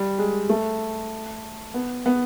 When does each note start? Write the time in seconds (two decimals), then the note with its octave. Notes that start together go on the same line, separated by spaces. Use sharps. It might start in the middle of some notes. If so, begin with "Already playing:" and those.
Already playing: G3
0.19 G#3
0.49 A3
1.74 B3
2.06 B3